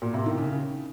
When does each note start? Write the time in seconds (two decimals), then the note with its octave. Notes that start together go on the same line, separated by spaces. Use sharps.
0.02 A#2
0.14 C3
0.26 D#3
0.38 C#3